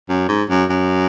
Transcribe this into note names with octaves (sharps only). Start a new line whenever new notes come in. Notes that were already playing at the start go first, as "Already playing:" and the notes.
F#2
G#2
F#2
F#2